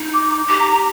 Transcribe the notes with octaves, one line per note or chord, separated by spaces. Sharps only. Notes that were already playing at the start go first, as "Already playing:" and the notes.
Already playing: D#4
D6
D6
G4 D6
A#5
A#5